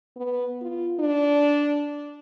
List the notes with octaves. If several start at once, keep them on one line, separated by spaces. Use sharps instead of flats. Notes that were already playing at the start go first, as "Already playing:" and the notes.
B3
F4
D4